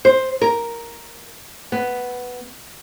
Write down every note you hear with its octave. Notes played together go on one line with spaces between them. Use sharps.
C5
A#4
B3